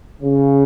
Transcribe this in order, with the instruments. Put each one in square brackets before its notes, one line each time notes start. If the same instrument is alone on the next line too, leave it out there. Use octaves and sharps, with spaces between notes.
[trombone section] C#3